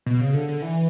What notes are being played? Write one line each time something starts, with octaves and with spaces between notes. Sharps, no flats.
B2
C#3
D3
D3
E3